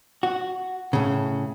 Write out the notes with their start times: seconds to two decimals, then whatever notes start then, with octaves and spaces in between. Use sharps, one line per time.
0.23 F#4
0.93 A2 C#3